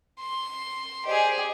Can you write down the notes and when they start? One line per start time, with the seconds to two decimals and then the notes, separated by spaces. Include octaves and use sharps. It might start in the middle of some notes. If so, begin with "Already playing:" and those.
0.19 C6
1.06 G4 G#4 C5 D5 D#5